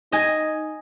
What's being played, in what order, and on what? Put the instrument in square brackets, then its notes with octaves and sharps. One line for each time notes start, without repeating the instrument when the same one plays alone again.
[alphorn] D#4 [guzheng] D#5 G#5